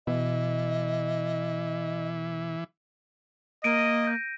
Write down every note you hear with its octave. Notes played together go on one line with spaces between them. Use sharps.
B2 E3 D#5
A#3 D#5 D7 D#7
G6 A#6